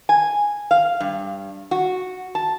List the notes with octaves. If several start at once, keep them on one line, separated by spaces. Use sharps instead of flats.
G#5
F5
G2
F#4
A5